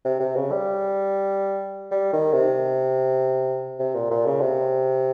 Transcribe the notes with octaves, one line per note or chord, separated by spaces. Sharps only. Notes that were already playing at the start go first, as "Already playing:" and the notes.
C3
C3
C#3
G3
G3
D#3
C3
C3
A#2
A#2
C#3
C3